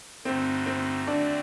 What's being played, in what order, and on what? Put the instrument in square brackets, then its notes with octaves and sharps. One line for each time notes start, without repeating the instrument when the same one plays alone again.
[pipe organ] G2 D3 A3 D#4 F#4 [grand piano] C4
[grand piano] C4
[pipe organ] D3 A3 C4 F#4 [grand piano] D4